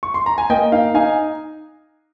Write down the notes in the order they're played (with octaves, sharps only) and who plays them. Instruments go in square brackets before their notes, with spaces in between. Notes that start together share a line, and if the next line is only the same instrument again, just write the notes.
[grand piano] C#6
C6
A#5
G#5
[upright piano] A#3 [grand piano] D#5 G5
[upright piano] D#4 [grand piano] F5
[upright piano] D#4 [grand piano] F5 G#5